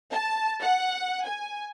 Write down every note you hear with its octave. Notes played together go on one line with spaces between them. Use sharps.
A5
F#5
G#5